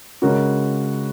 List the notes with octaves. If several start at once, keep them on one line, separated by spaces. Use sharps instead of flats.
C#3 G#3 C#4 F#4 A#4